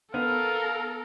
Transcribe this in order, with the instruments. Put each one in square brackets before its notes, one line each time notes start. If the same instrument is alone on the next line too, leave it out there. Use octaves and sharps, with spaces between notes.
[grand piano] B3 [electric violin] A4 A#4 [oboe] F5